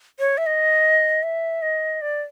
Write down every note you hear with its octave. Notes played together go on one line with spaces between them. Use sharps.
C#5
E5
D#5
E5
D#5
D5